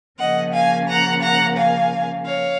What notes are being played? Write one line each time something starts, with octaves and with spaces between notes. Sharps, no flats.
C#3 F3 A#3 C#4 D#5 F#5
F5 G#5
F#5 A#5
F#5 A#5
F5 G#5
C#5 F5